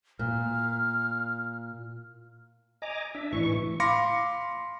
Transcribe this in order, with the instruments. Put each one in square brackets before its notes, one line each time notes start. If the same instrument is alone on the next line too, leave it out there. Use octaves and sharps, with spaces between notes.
[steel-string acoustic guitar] A#2 [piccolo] F6
[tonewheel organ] D#5 G#5 A#5 D6
D4 E5
A2 E3 C#6
[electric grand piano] F5 B5 C6 D6 A#6 C#7